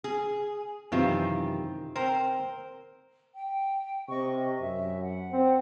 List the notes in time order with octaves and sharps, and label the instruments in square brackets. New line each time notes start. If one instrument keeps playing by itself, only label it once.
[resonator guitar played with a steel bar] G#4
[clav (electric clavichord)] F#2 C3 E3 [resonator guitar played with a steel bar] D#3 C4 F4
[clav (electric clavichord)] C4 G5 A#5 [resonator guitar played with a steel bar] A#4 C5
[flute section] G5
[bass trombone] C3 [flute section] D#5 C#6
[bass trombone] F#2 [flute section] E5
[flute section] F#5
[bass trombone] C4